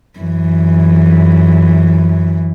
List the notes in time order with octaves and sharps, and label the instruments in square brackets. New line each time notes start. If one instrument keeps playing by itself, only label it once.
[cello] F#2 E3